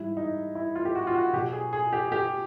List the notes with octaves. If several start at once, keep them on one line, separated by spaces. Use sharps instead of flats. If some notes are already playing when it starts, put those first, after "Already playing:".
Already playing: G#2 E3 G3 E4
D#4
E4
F4
G4
F#4
F4
F#4
B2 F#3 G4
G#4
G#4
G4
G4